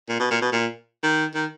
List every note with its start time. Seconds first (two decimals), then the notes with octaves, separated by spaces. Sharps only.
0.09 A#2
0.20 B2
0.31 A#2
0.42 B2
0.52 A#2
1.04 D#3
1.35 D#3